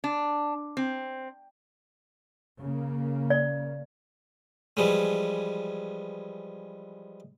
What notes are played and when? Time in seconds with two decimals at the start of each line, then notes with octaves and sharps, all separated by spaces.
0.04 D4
0.77 C4
2.61 C#3 A#3
3.30 D5
4.77 E3 F3 G3 G#3